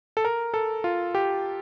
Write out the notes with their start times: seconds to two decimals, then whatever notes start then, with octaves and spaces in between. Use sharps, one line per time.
0.17 A4
0.25 A#4
0.54 A4
0.84 F4
1.15 G4